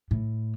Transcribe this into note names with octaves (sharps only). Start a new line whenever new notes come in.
A2